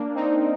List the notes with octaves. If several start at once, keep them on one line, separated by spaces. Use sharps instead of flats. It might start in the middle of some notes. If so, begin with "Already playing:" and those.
Already playing: A#3 D4
C4 D#4